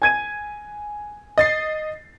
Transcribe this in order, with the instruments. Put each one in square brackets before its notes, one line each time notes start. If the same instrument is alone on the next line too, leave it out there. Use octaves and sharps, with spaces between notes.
[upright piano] G#5 G#6 D#7
[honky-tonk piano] D#5 A6 C7